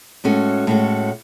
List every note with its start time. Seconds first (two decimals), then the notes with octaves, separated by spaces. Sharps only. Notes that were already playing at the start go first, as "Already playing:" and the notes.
0.24 A2 G#3 C#4 F#4 A4
0.67 A2 G#3 C#4 F#4 A4